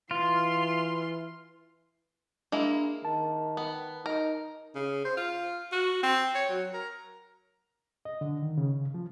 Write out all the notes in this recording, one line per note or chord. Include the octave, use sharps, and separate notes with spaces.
E3 F4 C6
G#3 A#3 D4 E4
D#3 A5
B3
D#4 A#4
C#3
C5
F4
F#4
C4
C#5
F#3
A#4
D#5
D3
D#3
C#3
F3